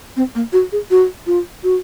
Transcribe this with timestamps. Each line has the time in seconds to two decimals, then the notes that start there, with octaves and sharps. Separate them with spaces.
0.16 C4
0.35 A#3
0.53 F#4
0.72 G#4
0.91 F#4
1.26 F4
1.64 F#4